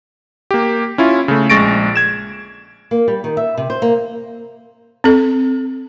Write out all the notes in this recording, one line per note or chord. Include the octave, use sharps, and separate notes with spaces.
A#3 G4
C#4 E4 F4
C#3 A3
A#1 G#3 C#6 A6 A#6 D7
G#6 E7
A#3
G3
D#3
E5
C3
C5
A#3
C4 A4